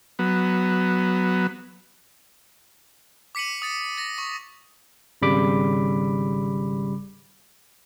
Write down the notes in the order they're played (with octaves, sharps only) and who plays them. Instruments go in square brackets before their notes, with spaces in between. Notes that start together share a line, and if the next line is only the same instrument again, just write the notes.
[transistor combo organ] F#3 B3
[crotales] D6 B6 C#7 D#7 F#7
D#6 A6 C#7
A6 A#6
C#6
[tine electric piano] G#1 C#3 G3 B5 D6